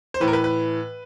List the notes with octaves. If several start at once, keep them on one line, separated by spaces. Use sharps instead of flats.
C5
A2 E3 B4
A#4
B4
B4